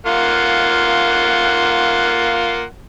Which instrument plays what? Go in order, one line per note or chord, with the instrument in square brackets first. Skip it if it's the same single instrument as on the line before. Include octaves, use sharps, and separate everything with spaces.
[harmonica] A#3 F4 F#5